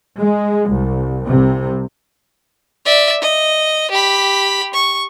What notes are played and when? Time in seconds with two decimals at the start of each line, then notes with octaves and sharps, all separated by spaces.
0.17 G#3
0.69 C2
1.28 C2 C3
2.85 D5 E5
3.21 D#5
3.90 G4 B5
4.74 C#6